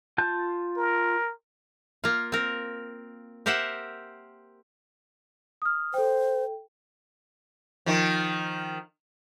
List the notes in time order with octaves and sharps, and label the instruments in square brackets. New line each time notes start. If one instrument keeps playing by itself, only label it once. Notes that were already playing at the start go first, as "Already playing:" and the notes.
[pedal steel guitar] F4 A5 G6
[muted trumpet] A#4
[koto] A#3 F4
C4 A#4
G4 A#4 C5 E5 F#5
[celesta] D#6 F6
[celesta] A4 G5 [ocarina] C5
[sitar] D#3 F3